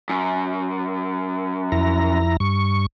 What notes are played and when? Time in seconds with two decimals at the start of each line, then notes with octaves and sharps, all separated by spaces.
0.09 F#2
1.72 F2 E4 A#5
2.40 G2 C#6